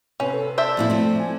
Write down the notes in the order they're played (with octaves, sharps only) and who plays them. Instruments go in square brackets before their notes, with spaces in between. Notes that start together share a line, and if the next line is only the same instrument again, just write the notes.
[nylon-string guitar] C3 [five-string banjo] C#4 [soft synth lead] B4
[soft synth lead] A4
[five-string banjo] D4 C5 E5 [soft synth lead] A5
[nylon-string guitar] F2 A#2 E4
[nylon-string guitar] F3 C4 [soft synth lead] A3
[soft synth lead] G#5